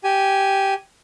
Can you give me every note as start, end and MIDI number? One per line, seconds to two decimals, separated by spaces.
0.04 0.74 67
0.04 0.74 80